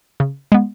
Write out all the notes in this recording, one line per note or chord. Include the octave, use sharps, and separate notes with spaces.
C#3
G#3 B3